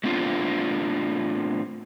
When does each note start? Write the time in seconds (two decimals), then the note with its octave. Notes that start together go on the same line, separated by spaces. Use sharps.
0.04 A2 B3 C4 D4 F4 F5